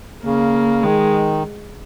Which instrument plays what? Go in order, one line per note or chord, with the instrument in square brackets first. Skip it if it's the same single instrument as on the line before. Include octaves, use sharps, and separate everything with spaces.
[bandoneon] C#3 [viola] A#3
[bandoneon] D#3 [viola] G#3